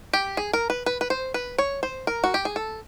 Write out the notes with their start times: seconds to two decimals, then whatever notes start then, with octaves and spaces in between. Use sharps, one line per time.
0.13 G4
0.37 G#4
0.53 A#4
0.70 B4
0.86 B4
1.01 B4
1.10 C5
1.34 B4
1.58 C#5
1.83 C5
2.07 A#4
2.24 F#4
2.34 G4
2.45 G#4
2.56 A4